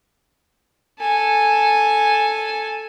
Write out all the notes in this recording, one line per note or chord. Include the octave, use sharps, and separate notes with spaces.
A4 G#5